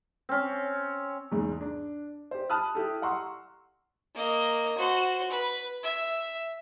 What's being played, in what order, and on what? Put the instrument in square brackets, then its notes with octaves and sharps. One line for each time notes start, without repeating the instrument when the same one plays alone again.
[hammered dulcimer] C4 C#4
[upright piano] E2 G#2 G#3
D4
G4 C5
A5 B5 D#6 F6 F#6
E4 G4 A4
F#5 A#5 C6 C#6 E6
[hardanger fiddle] A#3 D#5
F#4 C5
B4
E5